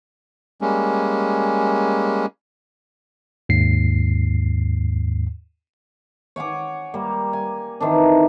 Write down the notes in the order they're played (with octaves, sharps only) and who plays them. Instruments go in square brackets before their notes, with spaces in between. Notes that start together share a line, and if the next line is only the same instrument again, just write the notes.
[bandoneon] G3 G#3 A#3 C#4
[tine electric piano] D#2 G#2 C7
[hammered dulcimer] C#5 F#5 G#5 D6
G3 A#3
G#5
D#3 E3 C4 D4